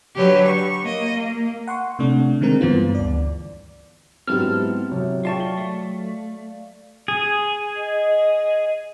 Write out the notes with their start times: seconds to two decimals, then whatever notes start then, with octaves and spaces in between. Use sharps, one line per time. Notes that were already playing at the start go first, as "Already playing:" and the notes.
0.15 D3 F#3 G4 B4 C#5
0.46 C#6
0.82 A#3 D#5
1.14 A#3
1.68 F#5 C6 C#6
1.99 C3 A3 D4
2.41 D3 D#3 G#3 C4 A#4
2.61 G2 E3 B3 F4
2.95 D2 D5
4.27 G#2 F#3 B3 C4 E4 G4 A4 F6
4.92 C3 F#3
5.25 F4 G#4 D5 E5 F5 G5 A5 C#6
5.40 G7
5.58 A3
7.08 G#4
7.76 D#5